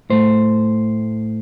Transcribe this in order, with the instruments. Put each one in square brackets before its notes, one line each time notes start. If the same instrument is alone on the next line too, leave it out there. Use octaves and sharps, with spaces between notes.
[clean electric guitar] A2 A3 C5